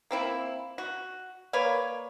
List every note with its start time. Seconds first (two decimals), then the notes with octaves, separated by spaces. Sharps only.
0.11 A#3 C4 E4
0.78 F#4
1.53 A#3 B4 C#5 D5